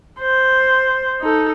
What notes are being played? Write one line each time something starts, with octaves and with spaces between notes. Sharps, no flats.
C5
D#4 A4